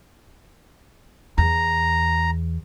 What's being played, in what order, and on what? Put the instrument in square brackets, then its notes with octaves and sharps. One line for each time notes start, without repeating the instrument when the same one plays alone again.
[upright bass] E2 [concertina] A#5